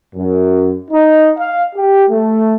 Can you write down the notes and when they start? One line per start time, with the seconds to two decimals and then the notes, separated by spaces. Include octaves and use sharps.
0.15 F#2
0.91 D#4
1.39 F5
1.75 G4
2.09 A3